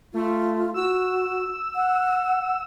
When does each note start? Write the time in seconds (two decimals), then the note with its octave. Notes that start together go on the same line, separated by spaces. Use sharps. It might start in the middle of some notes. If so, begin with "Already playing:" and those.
0.14 A3 F4
0.74 F#4 E6
1.75 F#5